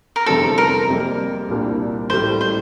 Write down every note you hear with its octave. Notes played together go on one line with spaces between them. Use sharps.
A#4
F1 E2 D3 G3 C4 A4
A#4
F2 C3 G3 A#3
C2 A#2 G3 A#3 D4
A1 A2 G3 C5
C5